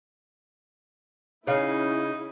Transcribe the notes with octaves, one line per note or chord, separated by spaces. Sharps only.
C#3 C#4 D#4 E4 C#5 F5